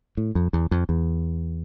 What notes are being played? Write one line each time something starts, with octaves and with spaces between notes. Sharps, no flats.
A2
F2
E2
F2
E2